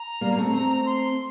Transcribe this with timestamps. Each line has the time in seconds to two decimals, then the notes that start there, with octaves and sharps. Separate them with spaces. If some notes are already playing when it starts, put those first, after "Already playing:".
Already playing: A#5
0.21 G3 A#3
0.32 A#3
0.37 A3 C4
0.53 A3 C4 A#5
0.69 A#5
0.86 C6